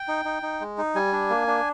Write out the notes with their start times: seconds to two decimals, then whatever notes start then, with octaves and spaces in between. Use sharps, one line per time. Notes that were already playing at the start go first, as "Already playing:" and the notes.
Already playing: G5
0.08 D#4
0.25 D#4
0.43 D#4
0.60 G#3
0.78 D#4
0.95 G3 G#5
1.12 D4
1.30 A#3
1.47 D4